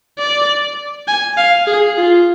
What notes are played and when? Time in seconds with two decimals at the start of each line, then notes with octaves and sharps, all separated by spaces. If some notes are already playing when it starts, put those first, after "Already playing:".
0.19 D5
1.08 G#5
1.37 F5
1.67 G#4
1.98 F4